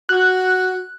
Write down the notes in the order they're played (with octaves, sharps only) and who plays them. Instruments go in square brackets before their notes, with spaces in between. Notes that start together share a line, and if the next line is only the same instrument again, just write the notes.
[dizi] F#4 [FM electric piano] F#6